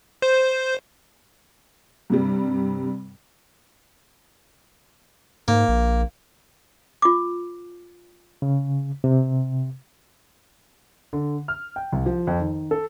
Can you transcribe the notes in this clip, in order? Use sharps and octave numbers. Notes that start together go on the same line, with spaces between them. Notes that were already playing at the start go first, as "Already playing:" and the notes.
C5
G2 C3 G3
G#2 A#3
A#1
F4 D6
C#3
C3
D3
F6
G5
C2
F3
F2
D#3
A4